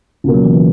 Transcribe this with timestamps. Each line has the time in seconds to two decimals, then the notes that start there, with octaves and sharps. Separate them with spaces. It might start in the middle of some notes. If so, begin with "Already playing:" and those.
0.24 C#2 B2 A#3
0.34 F#3
0.44 E3
0.54 E3